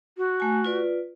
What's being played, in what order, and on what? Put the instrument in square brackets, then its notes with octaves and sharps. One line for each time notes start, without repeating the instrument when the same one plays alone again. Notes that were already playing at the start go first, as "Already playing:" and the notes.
[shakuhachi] F#4
[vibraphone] A3 G#5
F4 B4 D5